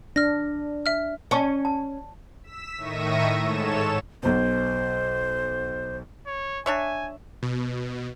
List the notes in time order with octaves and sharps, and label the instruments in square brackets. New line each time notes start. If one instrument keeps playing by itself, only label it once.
[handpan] D4 [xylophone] F6 A#6
[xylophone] E5 F6
[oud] C#4 [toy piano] D5 A5 C#6
[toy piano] A5
[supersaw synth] E6 B6 E7
A2 D#3 E5 C#6 A#6 D#7
G#2 A4 C#5 E7
[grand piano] B1 B2 [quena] C5
[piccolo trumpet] C#5
[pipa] D4 C#5 E5 [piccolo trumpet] G#5
[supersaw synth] B2